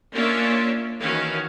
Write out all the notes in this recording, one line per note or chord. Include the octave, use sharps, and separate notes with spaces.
A#3 C#4 D4 F4 C#5 E5
D#3 E3 C#4 F#4 F5